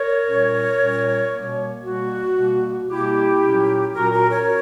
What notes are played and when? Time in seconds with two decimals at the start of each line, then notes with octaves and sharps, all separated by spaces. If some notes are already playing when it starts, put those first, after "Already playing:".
Already playing: A#4 C#5
0.25 A#2 G3 C#4
0.79 A#2 G3 C#4
1.31 B2 G3 A#3
1.83 B2 G3 A#3 F#4
2.37 B2 G3 A#3
2.90 B2 G3 A#3 E4 G4
3.43 A#2 F#3 C#4
3.95 A#2 F#3 C#4 F#4 A#4
4.13 F#4 A#4
4.31 A#4 C#5